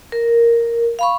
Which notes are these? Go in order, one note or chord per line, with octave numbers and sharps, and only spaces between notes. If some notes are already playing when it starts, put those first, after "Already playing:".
A#4
F5 B5 C#6